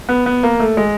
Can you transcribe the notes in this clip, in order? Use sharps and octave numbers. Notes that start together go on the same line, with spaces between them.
B3
B3
A#3
A3
G#3